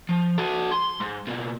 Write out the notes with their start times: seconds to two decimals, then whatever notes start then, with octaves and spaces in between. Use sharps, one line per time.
0.09 F3
0.38 F#4 A4
0.72 C6
1.01 G#2
1.27 B2 A#3